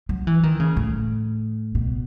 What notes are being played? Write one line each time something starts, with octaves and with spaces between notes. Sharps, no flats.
F#3
E3
D#3
C#3
A2
B2